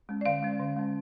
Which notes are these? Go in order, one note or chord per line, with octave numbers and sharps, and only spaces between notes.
G#3 C#4
D5
D3 F5
G#3 C#4
D3
G#3 C#4